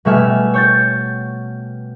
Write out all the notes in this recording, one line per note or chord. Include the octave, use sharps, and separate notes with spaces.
B2 G3 A3 E5 G#5 F6
C#5 G6 A6